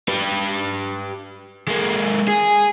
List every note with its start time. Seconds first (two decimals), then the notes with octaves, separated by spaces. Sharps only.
0.08 G4 B4
1.68 G#3 A#3
2.28 G#4